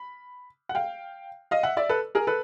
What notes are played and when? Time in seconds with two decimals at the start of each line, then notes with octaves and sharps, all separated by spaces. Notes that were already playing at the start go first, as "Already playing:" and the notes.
Already playing: B5
0.69 F#5
0.75 F5 G5
1.51 D#5 F5
1.63 E5 F#5
1.77 D5 E5
1.89 A4 B4
2.15 G#4 A#4
2.27 A4 B4